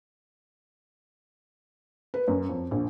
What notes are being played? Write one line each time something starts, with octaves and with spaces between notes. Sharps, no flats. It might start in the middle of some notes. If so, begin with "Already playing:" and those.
B4
F#2
F2
A#1